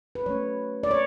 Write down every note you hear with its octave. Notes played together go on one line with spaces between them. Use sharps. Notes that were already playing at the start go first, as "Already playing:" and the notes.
B4
F#3 A3 C#4 C#5
D5
C#5